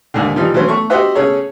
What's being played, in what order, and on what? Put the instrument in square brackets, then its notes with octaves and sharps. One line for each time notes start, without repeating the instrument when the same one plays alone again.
[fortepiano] D#2 G#2 D3
E3 F3 G3 D#4
E3 F#3 A3 C#4 C5
A3 C#6
F#4 G4 C5 D#5 E5 F#5
C#3 C#4 G#4 A4 C#5